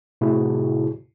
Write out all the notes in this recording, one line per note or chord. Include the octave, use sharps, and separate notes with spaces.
A2 C3 E4 F#4 G#4